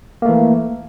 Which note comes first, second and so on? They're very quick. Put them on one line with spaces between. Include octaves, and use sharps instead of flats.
A#3 A3 E3